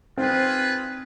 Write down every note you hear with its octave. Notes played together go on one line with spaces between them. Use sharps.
C4 F4 G#4 B4